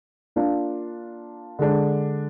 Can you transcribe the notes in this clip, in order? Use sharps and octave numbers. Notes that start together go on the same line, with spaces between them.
A#3 D4 F4
D3 G#3 D4